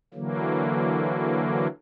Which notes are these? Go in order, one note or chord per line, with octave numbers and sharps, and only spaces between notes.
D3 E3 F#3 A#3